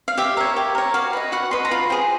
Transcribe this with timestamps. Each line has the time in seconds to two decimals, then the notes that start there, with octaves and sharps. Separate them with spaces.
0.08 F5
0.18 G4 E5
0.37 A#4 C#5 E5
0.56 G4
0.75 A#4 C#5
0.94 F#4 F5
1.13 B4 D#5
1.32 F#4 F#5
1.51 B4 D#5 C6
1.65 A#5
1.71 F4 B5
1.90 G#4 C5 G5